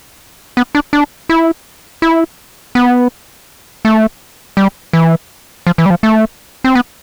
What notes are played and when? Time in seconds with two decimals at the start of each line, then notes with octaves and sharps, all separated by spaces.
0.57 B3
0.75 D4
0.93 D4
1.29 E4
2.02 E4
2.75 B3
3.85 A3
4.57 G3
4.93 E3
5.67 F3
5.78 E3
5.86 G3
5.90 F3
6.03 A3
6.64 C4
6.75 B3